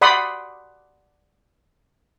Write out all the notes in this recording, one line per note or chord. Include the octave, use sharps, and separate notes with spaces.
D5 F#5 B5 C6 D#6